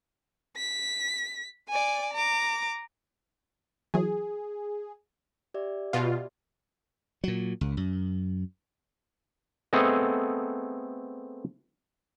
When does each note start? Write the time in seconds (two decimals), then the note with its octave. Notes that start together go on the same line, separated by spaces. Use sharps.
0.57 B6
1.69 D5 G#5
2.13 A#5 D6
3.94 E3 F#3 G#4
5.54 G4 D5 E5
5.93 B2 F4
7.24 A#2 F#3
7.61 C#2
7.77 F#2
9.73 A3 B3 C4 G#4 A4 D#5